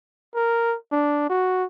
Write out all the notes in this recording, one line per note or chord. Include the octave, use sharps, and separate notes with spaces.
A#4
D4
F#4